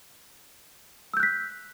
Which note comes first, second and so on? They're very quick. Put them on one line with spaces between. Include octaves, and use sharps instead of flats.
E6 G6 F#6 B6